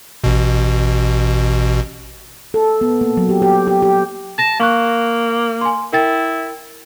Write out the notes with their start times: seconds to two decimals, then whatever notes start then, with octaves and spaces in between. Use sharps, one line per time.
0.24 A1 B2
2.54 A4
2.81 B3
3.01 A#3
3.17 F#3
3.29 G4
3.42 G4
3.67 G4
3.82 G4
4.38 A5 A6 A#6 E7
4.60 A#3 F5 C#6 F#6
5.61 G#5 C6
5.93 E4 A#4 G5 A6